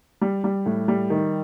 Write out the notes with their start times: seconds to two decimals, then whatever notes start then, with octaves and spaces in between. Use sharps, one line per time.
0.21 G3
0.44 G3
0.66 A2
0.88 G3
1.10 D#3